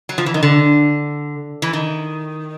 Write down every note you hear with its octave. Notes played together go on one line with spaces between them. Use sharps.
F#3
F3
E3
D#3
D3
E3
D#3